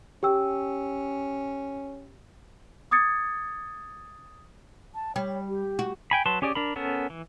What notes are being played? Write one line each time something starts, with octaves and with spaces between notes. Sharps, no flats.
C#4 G4 G5 E6
D6 D#6 G#6 A6 C#7
A5
G3 C#5
G4
F#4
G5 G#5 B5
F#3 B4 A5 C6
C#4 G4 G#4 D5
D4 A#4 B5
B3 C#4 A4 A#4
E3